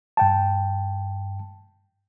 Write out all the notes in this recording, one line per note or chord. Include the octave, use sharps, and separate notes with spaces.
G2 G5 A5